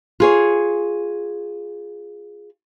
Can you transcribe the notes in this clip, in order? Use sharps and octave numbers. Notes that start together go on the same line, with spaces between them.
F4 G#4 C#5